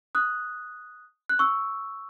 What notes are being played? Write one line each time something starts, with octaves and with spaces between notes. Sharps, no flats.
D#6 F#6
F#6
C#6 E6